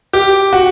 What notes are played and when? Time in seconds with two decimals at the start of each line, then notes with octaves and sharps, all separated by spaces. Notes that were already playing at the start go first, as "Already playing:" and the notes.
0.13 G4
0.53 F#4